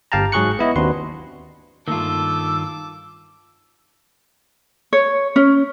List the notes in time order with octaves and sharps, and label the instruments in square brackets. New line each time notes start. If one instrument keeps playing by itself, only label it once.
[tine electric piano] G1 G4 F5 G5 A5 A#5
G#2 F#3 G#4 C#6 F#6 C#7
B3 E4 D#5
D#2 C4 D4 F#4 B4 C6
[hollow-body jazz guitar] G2 A3 A#3 [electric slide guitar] D#3 F4 [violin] A5 D6 [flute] E6
[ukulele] C#5
C#4